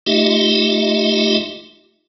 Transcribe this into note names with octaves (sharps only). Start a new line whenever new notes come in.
A3 D#4 F4 G4 D#5 E5